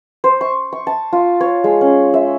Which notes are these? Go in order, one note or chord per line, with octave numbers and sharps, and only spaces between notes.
C5
C#6
C#6
A5
F4
C#5
G#3
C#4
E5